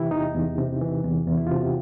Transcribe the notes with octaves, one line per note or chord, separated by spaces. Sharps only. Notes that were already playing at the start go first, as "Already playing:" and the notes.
Already playing: C3 E3 E4 G4
E2 D#4
E2
C3
E3
E2
E2
E4
F4
C3 F#4
G4